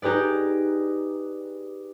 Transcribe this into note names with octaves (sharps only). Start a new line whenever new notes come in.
D#4 G4 G#4 B4 D5